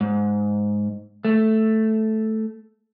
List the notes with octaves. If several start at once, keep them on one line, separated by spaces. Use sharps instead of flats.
G#2
A3